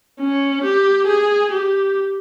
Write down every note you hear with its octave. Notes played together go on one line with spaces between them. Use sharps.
C#4
G4
G#4
G4